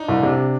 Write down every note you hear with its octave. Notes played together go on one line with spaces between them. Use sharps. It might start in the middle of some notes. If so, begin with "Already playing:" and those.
Already playing: D4 D#4
C2
C3 D4